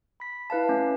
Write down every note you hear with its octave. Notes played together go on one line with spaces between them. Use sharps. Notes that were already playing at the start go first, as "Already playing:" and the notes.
B5 B6
E4 B4 F5 A5
A3 C#4 E4 B4